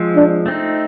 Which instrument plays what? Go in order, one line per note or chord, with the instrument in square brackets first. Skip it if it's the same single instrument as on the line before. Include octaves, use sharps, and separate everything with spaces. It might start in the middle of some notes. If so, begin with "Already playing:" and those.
Already playing: [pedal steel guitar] F3 G#3 C4
[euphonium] D4
[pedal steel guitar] A3 C4 D#4